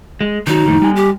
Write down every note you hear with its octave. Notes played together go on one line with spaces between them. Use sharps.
G#3
D#3 F#3 D#4
F2 A2 D#3
G3 G#5
G4